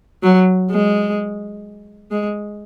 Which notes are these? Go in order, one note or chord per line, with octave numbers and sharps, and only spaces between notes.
F#3
G#3
G#3